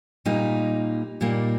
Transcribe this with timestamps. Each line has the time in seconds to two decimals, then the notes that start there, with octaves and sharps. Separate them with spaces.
0.25 A#2 G3 A#3 D#4
1.21 A#2 G3 A#3 D#4